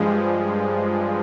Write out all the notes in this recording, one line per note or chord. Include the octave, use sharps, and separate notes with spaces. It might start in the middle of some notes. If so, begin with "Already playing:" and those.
Already playing: G2 F3 G#3